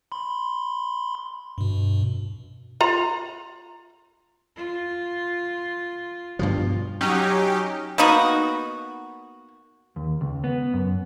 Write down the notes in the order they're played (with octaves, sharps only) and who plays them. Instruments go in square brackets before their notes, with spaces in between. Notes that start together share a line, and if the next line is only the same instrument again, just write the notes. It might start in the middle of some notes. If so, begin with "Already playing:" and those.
[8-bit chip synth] B5 C6
G2 B2
[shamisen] F4 A#5
[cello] F4
[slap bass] G2 B2 F3 [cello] F4
[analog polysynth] F#3 C#4 D#4 [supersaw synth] G4
[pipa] A#3 B3 D#4 F#4
[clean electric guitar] D#2
C#2
B3
F#2